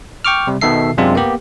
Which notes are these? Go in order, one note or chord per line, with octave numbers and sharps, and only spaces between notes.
G5 C#6 D6 F6
C3 G3
B2 D#3 A4 E5 C7
F#2 C3 G#3 C4 D4 F4
A#3 B3 G4